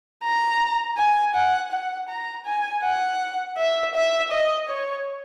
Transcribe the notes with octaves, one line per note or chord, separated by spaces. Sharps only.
A#5
G#5
F#5
F#5
A#5
G#5
F#5
E5
E5
D#5
C#5